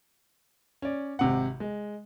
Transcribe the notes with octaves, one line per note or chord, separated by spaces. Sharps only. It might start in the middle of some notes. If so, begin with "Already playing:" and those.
C#4 D5
G#1 C3 F#5
G#3